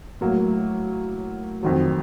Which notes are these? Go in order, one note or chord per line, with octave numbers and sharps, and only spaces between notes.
A2 F#3 A#3
F2 D#3 F#3